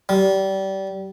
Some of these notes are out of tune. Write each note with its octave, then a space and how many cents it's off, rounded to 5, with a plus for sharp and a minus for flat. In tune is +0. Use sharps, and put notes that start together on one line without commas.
G3 -25